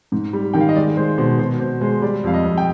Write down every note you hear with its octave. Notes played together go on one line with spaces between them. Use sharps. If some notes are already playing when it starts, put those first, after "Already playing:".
G#2
G3
D#3 G5
F5
D#5
G#3 D5
G#3 C5
B2 C5
B2 C5
B2 C5
G#3 C5
G3 D5
F2 F5
D#5
F2
G5